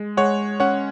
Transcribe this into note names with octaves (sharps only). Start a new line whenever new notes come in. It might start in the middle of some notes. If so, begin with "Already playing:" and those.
Already playing: G#3
G#3 C#5 F#5
C#4 C#5 F#5